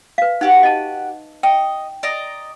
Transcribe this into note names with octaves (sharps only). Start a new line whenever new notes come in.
B4 F5
D#4 F#4 G4 F#5
D#5 A5
D#5 G5
D5 D#5 A#5